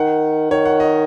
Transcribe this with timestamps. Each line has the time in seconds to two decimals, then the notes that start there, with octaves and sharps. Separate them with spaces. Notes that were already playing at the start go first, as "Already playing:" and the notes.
Already playing: D#3 F#5
0.51 D#3 C#5
0.65 F#5
0.80 D#5